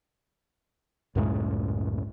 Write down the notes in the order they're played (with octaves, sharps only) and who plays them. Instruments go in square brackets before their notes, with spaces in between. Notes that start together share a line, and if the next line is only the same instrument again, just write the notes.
[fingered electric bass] C#2 F#2 A2 G#3